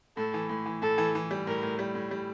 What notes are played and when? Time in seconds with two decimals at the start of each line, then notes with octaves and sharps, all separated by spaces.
0.17 A2 A4
0.34 E3
0.49 A2
0.66 E3
0.82 A2 A4
0.98 E3
1.15 E3
1.31 G3
1.47 A2 A#4
1.63 A2
1.79 G3
1.95 A2
2.11 G3